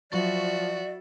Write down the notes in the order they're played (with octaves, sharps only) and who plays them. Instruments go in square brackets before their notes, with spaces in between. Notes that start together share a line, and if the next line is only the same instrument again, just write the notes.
[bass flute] F3 [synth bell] F#3 C#6 A6 [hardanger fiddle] F#4 E5 [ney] D5